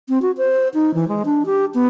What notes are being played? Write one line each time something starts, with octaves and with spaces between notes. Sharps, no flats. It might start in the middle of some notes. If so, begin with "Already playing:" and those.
C4
F#4
C5
D#4
E3
G#3
D4
G4
B3